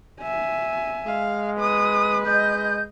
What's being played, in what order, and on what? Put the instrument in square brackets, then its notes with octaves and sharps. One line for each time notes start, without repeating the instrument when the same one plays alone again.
[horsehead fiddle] E5 G#5
[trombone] G#3 [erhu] F5
[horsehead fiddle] B4 [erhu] D#6
[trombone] G#3 [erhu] D#5 [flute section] G6